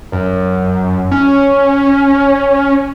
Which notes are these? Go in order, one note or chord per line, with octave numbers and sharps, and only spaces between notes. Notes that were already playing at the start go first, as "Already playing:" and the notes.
F#2
C#4